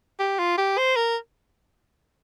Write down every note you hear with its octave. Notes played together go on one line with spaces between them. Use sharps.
G4
F4
G4
C5
A#4